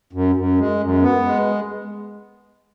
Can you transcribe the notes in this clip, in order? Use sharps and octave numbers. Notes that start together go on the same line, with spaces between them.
F#2
F#2
G#3
F#2
B3
G#3